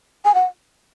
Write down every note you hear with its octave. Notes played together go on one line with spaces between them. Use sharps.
G#5
F#5